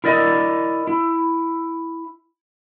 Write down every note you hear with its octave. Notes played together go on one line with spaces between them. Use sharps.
E4 A#4 D5 D#5
E4